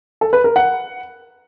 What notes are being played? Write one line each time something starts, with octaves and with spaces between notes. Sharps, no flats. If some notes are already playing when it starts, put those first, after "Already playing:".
A4
B4
A#4
F#5